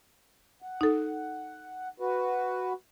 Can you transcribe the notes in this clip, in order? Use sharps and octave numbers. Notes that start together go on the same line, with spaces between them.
F#5
D#4 A4
F#4 B4